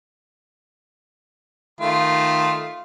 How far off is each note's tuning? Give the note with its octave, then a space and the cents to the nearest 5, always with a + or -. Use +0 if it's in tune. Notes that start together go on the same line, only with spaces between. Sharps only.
D#3 +0 A3 +0 F4 +0